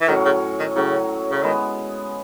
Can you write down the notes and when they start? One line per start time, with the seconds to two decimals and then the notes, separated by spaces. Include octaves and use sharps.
0.01 E3
0.08 A2 D#3 F#3 C#4
0.25 C#3
0.59 D#3
0.75 A2 C#3 F#3 C#4
1.31 C#3
1.43 D#3 G#3 B3 E4